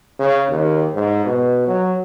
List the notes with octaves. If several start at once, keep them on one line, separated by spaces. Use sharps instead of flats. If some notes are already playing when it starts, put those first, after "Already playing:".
C#3
D#2
G#2
B2
F#3